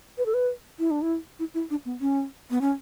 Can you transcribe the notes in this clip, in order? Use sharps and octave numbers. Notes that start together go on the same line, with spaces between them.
B4
A4
B4
E4
D4
E4
E4
E4
D4
B3
C#4
B3
C#4